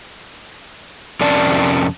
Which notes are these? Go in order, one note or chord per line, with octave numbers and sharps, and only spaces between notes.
F2 C3 C#4 A#4 D5 A5